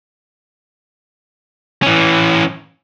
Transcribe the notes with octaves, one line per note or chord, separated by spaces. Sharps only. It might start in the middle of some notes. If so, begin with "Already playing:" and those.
E3 C#4